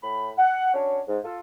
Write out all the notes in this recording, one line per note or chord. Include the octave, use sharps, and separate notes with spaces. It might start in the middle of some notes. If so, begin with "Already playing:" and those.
A2 B5
F#5
C#4 D4 F#4 C#5
G#2
F4 A4